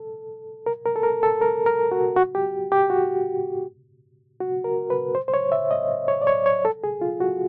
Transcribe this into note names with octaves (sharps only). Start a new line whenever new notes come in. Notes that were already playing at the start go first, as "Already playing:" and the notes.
Already playing: A4
A#4
A#4
A4
A#4
A4
A#4
A#4
F#4
F#4
G4
G4
F#4
F#4
A#4
B4
C5
C5
C#5
E5
D#5
C#5
D5
C#5
C#5
A4
G#4
F4
F#4